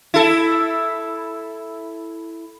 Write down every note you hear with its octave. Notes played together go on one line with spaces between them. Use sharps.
E4 A4